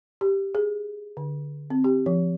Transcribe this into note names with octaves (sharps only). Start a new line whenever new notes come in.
G4
G#4
D3
C4
G4
F3